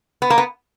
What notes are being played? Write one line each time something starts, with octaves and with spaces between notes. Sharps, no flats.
B3
A#3
B3